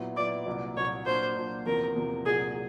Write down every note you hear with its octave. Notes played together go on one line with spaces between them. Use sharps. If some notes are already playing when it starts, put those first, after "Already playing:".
Already playing: A#2 F#3 B3 E4
A#2 F#3 B3 E4 D5
C2 A#2 F#3
C2 A#2 F#3 C#5
A#2 F#3 A#3 D4 C5
A#2 F#3 A#3 D4
E2 C3 F3 A#4
E2 C3 F3
C2 A#2 F#3 G#4